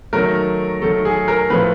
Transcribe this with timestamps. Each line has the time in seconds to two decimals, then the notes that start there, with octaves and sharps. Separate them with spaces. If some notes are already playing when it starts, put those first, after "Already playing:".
0.13 D#3 F#3 A3 A#4
0.82 D#3 F#3 A3 A4
1.05 G#4
1.28 A#4
1.50 A2 F3 A3 B4